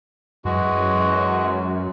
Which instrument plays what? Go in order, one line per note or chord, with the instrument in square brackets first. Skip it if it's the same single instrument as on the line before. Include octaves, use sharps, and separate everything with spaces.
[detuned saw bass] F#2 [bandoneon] E3 G#3 F#4